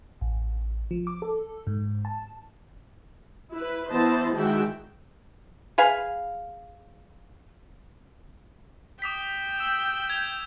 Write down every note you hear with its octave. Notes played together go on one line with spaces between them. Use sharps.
A1
F3
D6
A4
G#2
A5
E4 B4
E3 B3 E4 C5 D#5 A5
D#3 E3 G#3 F#4 E5 G5
G#4 B4 F5
G5 D6 D#6 B6
E6 E7
G#6 F7